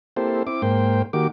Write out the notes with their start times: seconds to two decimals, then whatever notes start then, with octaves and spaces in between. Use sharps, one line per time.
0.17 A#3 C4 E4 G4 A4 C5
0.47 C4 E4 D6
0.62 G#2 A#3 C5 G5
1.13 D#3 A#3 F#4 G4 D6